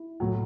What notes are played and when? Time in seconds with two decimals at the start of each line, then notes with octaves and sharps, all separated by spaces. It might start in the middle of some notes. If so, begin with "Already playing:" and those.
Already playing: E4
0.20 A2 F#3